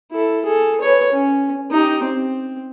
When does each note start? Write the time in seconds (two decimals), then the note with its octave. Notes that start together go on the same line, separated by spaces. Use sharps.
0.11 E4 A4
0.45 G#4 A4
0.81 B4 C#5
1.13 C#4
1.71 D#4 G4
2.04 C4